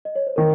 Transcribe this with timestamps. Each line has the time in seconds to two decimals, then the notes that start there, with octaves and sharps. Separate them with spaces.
0.05 D#5
0.16 C#5
0.27 C5
0.36 D#3 A#4